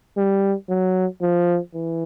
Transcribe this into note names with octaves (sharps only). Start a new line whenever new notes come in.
G3
F#3
F3
E3